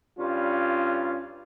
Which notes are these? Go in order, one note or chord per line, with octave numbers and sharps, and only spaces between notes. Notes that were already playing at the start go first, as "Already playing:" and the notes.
G2 G3 C#4 F4